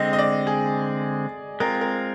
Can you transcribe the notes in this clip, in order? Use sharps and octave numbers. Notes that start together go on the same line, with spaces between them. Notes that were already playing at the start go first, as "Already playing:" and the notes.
Already playing: D3 G#3 C4 D#5
D#5
D5
G#4
G#3 C4 F4 A#4
A#4